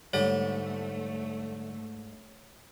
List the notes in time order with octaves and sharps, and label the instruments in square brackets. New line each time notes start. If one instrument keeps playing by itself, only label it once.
[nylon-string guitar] G#2 [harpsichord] D3 G3 G4 [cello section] A3 [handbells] C#5